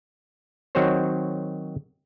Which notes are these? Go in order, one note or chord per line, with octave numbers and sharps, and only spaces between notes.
D#3 F#3 C4 F#4 C5 C#5